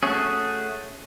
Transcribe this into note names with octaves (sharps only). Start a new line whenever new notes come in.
A3 C#4 F#4 G#4